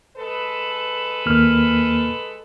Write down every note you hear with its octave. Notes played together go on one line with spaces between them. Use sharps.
G#3 A4 B4
D#2 A#3 F6